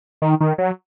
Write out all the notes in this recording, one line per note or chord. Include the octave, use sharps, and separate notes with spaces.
D#3
D#3
F#3